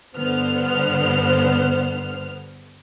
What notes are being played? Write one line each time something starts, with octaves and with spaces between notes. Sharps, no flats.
G2 D3 B3 C5 F6